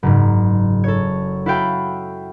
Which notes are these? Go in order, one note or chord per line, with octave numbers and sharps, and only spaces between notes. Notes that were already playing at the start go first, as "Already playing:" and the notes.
F#1 G#2
A4 C#5
E4 F#4 A4 F5 G5 B5